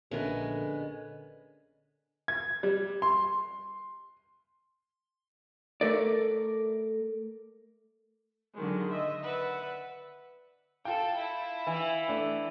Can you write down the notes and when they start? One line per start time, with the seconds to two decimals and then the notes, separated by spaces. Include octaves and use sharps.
0.11 A#1 D3 G#3 A3 B3 C#4 A#4
2.28 G#6
2.63 G3
3.02 C6
5.81 A3 A#4 D5
8.55 D3 D#3 F#3 G#3
8.91 D#5 E5
9.23 B4 D5 E5 F#5
10.85 F4 A4 G5
11.16 E4
11.67 E3
12.08 A3 D4